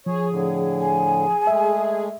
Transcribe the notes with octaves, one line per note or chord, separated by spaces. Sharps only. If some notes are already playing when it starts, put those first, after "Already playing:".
F3 G#4 C#5
A2 D3
G#5
G#3 A3 E5